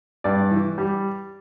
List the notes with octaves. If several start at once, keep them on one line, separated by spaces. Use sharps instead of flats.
G2 D5
E3
G3